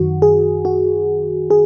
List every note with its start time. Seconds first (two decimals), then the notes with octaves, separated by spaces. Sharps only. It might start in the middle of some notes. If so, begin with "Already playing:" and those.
Already playing: F#2 D#3 F#4
0.22 G#4
0.65 F#4
1.50 G#4